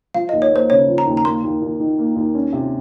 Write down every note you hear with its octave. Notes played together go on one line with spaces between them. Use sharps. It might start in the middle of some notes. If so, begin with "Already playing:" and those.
F3 F5
D#5
D#2
C#5
A#3 C5
C#3 C#5
F3
A#5
D#2
A#5
A#3 C6
D#2
D#2
D#3
A#3
D#2
C#4
C3